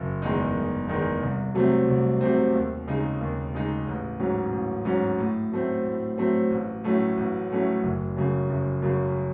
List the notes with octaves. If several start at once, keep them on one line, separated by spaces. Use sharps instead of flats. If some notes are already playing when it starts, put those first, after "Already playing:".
Already playing: F#1
E2 D#3 G#3 D#4
F#1
E2 D#3 G#3 D#4
C2
C3 F#3 A3 C4
C2
C3 F#3 A3 C4
D#2
C#3 G#3 D#4
D#2
C#3 G#3 D#4
A1
G#2 F#3 C#4
A1
G#2 F#3 C#4
A2
F#3 A3 C4
A2
F#3 A3 C4
A1
A2 F#3 A3 C#4
A1
A2 F#3 A3 C#4
F#1
F#2 C#3
F#1
F#2 C#3